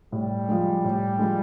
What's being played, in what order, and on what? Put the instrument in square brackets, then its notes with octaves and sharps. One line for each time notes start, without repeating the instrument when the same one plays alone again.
[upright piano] A2 [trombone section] G3
[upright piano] F3 G#3
A2
F3 G#3